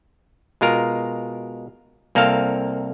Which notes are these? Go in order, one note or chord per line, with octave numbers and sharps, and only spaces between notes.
B2 G#3 F4 A#4
C2 A#3 C4 A4 F5